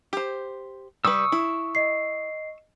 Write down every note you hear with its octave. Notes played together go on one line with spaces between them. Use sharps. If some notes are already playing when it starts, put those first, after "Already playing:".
G4 C5
G3 B4 C#6 D#6 E6
E4
D#5 C7